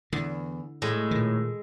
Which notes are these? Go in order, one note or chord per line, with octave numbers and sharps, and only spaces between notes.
E2 D3
A2 G#3
A#2 D#3